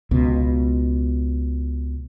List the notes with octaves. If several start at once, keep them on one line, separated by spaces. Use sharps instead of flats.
C#2 B2